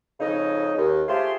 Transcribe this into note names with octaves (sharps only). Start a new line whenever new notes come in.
F2 C#3 D#4
D#2
A3 F4 G4 G#4 C5